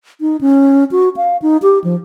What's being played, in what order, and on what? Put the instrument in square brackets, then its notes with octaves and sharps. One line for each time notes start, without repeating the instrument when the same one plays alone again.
[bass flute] D#4
C#4
F#4
F5
D#4
G4
F3